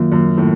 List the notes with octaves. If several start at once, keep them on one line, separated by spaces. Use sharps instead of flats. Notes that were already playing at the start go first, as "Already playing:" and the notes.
Already playing: F#2 D#3 A#3 F4
F#2
A2